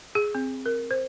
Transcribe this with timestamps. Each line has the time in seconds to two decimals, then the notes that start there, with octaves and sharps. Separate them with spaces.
0.15 G#4
0.35 C4
0.66 A#4
0.91 C5